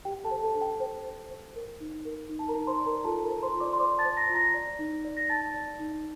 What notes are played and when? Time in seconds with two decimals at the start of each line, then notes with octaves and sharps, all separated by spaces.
0.05 G4 G5
0.24 A4 A5
0.31 C5
0.43 A4 A5
0.55 D4
0.61 G5
0.80 C5
1.05 C5
1.30 C5
1.55 A#4
1.80 D#4
2.05 A#4
2.29 D#4
2.39 A5
2.48 A#4 A#5
2.55 D#4
2.67 C5 C6
2.80 D5
2.86 A#4 A#5
3.04 F4 A4 A5
3.24 A#4 A#5
3.30 C5
3.43 C5 C6
3.55 F4
3.60 D5 D6
3.73 C6
3.79 C5 D5 D6
3.98 A5 A6
4.05 C5
4.17 A#5 A#6
4.29 F4
4.35 A#5 A#6
4.54 D5
4.79 D#4
5.05 D5
5.17 A#6
5.29 D#4 A5 A6
5.54 D5
5.79 D#4